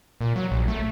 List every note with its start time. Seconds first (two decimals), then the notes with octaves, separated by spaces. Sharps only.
0.21 A#2
0.36 F#3
0.51 A#1
0.68 A3